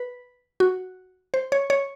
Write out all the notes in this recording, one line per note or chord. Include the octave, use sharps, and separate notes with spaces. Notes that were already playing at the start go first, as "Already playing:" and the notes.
Already playing: B4
F#4
C5
C#5
C#5